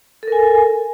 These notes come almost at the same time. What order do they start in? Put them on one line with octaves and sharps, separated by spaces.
A4 A#4 G#5